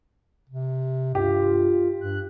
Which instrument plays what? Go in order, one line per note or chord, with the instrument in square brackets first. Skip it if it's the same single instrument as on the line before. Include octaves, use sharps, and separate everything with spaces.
[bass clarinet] C3
[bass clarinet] G2 [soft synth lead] F4 [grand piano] G4
[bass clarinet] G2 [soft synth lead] F#6